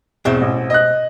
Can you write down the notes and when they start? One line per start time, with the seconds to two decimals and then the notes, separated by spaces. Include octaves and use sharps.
0.25 E2 B2 C4 E5
0.41 A1
0.70 D#5 F#6